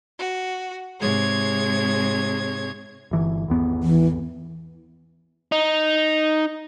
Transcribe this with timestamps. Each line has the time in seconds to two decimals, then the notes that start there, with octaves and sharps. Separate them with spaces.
0.20 F#4
1.00 G#2 C3 G#3 C#5 G#6
3.11 G1 E3
3.48 G#1 E2 B3
3.83 E3
5.52 D#4